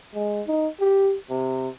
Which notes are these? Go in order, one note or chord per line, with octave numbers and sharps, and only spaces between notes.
G#3
D#4
G4
C3